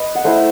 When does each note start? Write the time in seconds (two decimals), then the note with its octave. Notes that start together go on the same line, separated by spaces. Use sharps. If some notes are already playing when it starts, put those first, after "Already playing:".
Already playing: B4 D#5
0.15 F#5
0.25 A3 E4 C5 E5